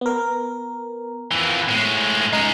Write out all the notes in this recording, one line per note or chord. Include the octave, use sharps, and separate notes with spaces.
B3 A#4
F2 E3
A2 G#3
G#3 C#4 D#4